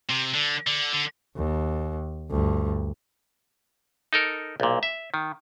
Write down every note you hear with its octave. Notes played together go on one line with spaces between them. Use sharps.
C3
D3
D3
D3
D#2
D2 G2
D#4 A4 A#4
B1 A#2
E5
D#3